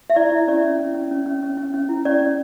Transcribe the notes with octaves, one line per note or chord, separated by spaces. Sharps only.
E5
E4 D5
E4
C#4 D5
C#4
C#4
C#4
C#4
C#4
C#4
C#4
C#4
E4
C#4 D5
C#4